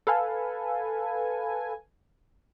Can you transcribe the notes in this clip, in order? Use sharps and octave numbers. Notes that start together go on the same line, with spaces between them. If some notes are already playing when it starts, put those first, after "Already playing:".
A4 B4 F5 G#5